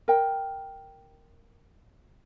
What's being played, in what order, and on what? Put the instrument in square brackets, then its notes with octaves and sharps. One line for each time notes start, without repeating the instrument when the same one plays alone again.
[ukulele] A#4 G5